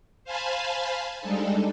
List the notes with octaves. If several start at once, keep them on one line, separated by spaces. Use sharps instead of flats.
C5 F5 G#5 A5 B5
G3 G#3 D4 D#4 A4